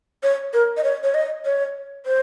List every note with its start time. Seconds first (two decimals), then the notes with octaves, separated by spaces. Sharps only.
0.23 C#5
0.54 A#4
0.77 D#5
0.84 C#5
1.04 C#5
1.14 D#5
1.45 C#5
2.06 C5